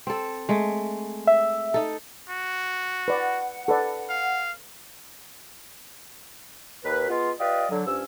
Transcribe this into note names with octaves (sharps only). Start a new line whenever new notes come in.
C4 A4
G#3 A3
E5
D#4 A4
F#4
B4 D5 F#5
A4 B4 D5
F5
D#2 B4
G#3 B3 F4
F4 G4 B4 D5 D#5
D3 F#3
G2 F3 C#4 E6